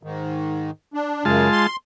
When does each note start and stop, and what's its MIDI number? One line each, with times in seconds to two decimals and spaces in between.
0.03 0.71 44
0.03 0.71 51
0.94 1.24 62
1.25 1.48 42
1.25 1.48 49
1.25 1.67 56
1.25 1.67 65
1.25 1.67 81
1.52 1.76 84